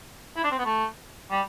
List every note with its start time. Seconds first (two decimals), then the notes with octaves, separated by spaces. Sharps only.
0.36 E4
0.44 D4
0.51 C4
0.58 B3
0.65 A3
1.31 G3